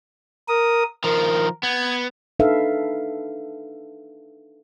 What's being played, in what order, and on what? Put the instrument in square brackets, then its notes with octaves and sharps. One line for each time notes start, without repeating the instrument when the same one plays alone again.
[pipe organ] A#4 D#6
[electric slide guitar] D#3 F3 [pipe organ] A#4
[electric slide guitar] B3 [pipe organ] G#6
[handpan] D4 D#4 A4 B4 E5 F5